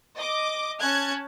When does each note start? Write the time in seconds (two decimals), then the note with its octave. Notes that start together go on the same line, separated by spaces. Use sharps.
0.17 D#5 D6
0.81 C#4 A5 F#6 G#6